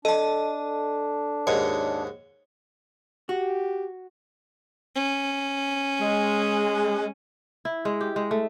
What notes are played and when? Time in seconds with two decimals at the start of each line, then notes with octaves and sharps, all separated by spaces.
0.05 D4 A4 D#5 A5
1.47 D#2 G#2 C#5
3.29 F#4 G4
4.95 C#4
6.00 G#3
7.65 E4
7.85 G#3
8.01 G4
8.16 G#3
8.31 A3